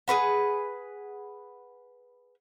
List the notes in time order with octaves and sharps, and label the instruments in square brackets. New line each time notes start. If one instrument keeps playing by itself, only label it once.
[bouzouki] G#4 A#4 B4 F#5